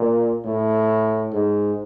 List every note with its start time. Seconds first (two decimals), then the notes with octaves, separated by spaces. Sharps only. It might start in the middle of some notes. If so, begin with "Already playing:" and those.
Already playing: A#2
0.45 A2
1.33 G#2